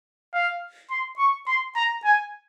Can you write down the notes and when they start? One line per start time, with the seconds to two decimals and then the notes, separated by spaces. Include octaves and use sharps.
0.33 F5
0.90 C6
1.18 C#6
1.47 C6
1.76 A#5
2.04 G#5